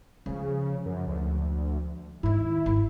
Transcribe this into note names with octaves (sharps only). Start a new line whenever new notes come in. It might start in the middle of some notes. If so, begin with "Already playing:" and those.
C#3 F3 G#3
F#2
D2
G#2 D#3 E4
G#1 F2